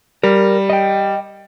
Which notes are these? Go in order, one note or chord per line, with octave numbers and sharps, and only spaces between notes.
G3 A#4
D#5 G5